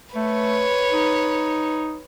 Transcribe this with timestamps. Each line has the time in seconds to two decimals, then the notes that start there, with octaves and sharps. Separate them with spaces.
0.15 A3 B4 C#5
0.91 D#4